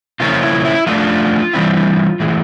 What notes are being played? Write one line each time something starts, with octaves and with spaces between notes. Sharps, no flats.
C#3 F3 A#3 C#4 E4 F4
E4
E4
F3 A3 D4 F4
E3 G3 C4 E4
A2 E3 G#3